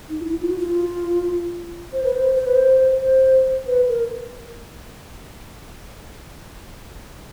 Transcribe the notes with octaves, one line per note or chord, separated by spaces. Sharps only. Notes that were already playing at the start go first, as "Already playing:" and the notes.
D#4
F4
E4
F4
F#4
F4
C5
B4
C5
C5
B4
C5
C5
B4
A#4